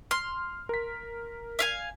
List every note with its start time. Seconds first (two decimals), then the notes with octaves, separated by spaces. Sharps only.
0.11 C6 F6
0.69 A#4 B6
1.59 E5 F5 G#5